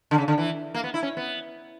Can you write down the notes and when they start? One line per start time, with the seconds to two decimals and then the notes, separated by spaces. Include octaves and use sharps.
0.11 D3
0.18 C#3
0.28 D3
0.38 E3
0.74 A#3
0.84 B3
0.94 E4
1.03 C#4
1.17 B3